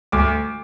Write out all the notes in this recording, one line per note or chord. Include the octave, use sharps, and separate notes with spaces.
D2 D6